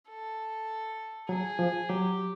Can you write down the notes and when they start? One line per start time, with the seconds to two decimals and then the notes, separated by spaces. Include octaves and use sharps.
0.09 A4
1.29 F#3 G#4
1.59 F3
1.89 F#3 G4